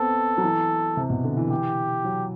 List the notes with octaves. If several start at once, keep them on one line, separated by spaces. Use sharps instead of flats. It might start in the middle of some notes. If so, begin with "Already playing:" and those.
Already playing: B3 C4 A4
F#3
E3
C3
B2
D3
E3
G4
F#3